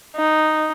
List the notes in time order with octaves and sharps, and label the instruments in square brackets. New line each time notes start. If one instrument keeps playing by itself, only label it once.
[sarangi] D#4